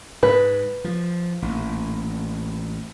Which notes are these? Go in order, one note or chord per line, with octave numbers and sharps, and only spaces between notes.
G#2 B4
F3
A1 A#2